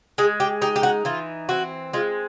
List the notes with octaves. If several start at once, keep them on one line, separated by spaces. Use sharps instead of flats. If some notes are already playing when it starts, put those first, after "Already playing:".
G#3 G#4
G4
D#4 G4
G4
F#4
E3 F4
C4 F#4
G#3 F4